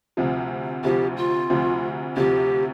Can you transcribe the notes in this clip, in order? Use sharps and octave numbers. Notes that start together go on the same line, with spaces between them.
D2 C3 F3
D2 C3 F3 G4
F4
D2 C3 F3
D2 C3 F3 G4